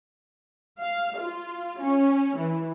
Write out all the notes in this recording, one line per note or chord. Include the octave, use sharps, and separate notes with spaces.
F5
F4
C#4
E3